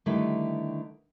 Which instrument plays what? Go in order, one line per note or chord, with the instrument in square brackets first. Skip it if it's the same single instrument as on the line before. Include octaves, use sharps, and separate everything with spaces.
[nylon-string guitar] D3 D#3 G3 A3 E4 B4